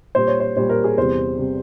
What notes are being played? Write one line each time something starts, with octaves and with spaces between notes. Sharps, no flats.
A#2 G3 C5
C#5
C5
A#2 G3 C5
A#4
G#4
E2 C3 G3 C5
C3 G3